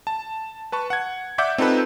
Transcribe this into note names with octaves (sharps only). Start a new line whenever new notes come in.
A5
B4 A5 C#6
F#5 G#6
D5 E5 F#5 D6 G6
C4 D#4 F4 A4 B4